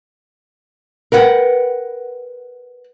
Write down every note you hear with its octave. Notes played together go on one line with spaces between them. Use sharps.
A#4 B4 F#5 G5